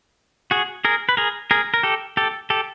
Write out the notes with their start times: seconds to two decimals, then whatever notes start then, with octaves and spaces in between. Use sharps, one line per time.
0.51 F#4 G#4
0.85 G#4 A#4
1.09 B4
1.17 G#4 A#4
1.51 G#4 A#4
1.74 A#4
1.83 G4 A4
2.17 G4 A4
2.50 G4 A4